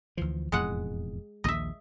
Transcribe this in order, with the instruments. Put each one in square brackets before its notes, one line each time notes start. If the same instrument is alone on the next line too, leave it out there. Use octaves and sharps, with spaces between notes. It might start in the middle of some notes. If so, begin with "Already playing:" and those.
[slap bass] D2 E3 F3
[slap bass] E1 F2 A2 [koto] G#3 F#5
[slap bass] A#1 D#2 A#2 [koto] D#5 E5